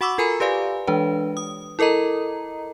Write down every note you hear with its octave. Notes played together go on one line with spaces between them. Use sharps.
F#4 F#5 B5 C#6 D6 E6
F4 A4 A#4 G#5 A#5 B5
G4 B4 D5 F5 G#5
E3 G#3 D4 B4
D#6
E4 A4 A#4 D#5 A#5